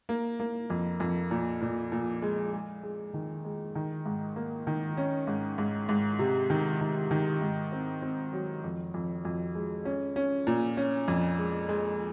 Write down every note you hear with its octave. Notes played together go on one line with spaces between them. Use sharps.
A#3
A#3
F2
F2
A#2
A#2
A#2
G#3
G#3
G#3
D#3
G#3
D#3
G#2
A#3
D#3
C#4
G#2
G#2
G#2
C3
D#3
D#3
D#3
G#2
C4
C4
F#3
F2
F2
F2
G#3
C#4
C#4
A#2
C#4
F2
G#3
G#3